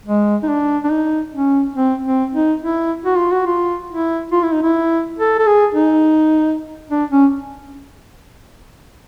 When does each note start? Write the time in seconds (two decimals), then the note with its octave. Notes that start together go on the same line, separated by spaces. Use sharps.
0.06 G#3
0.43 D#4
0.48 D4
0.84 D4
0.91 D#4
1.33 C#4
1.75 C4
2.05 C4
2.33 D#4
2.62 E4
3.05 F#4
3.17 F4
3.32 F#4
3.46 F4
3.90 E4
4.32 F4
4.42 E4
4.53 D#4
4.62 E4
5.18 A4
5.39 A4
5.46 G#4
5.74 D#4
6.89 D4
7.10 C#4